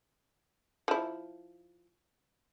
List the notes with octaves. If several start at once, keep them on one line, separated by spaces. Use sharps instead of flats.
F3 E4